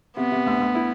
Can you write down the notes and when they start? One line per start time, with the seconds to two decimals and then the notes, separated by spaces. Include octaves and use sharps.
0.17 C3 B3
0.32 C3
0.46 D2
0.60 D2
0.75 E4